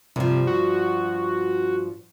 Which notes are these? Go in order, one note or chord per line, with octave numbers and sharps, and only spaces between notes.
G2 C3 F3
F#4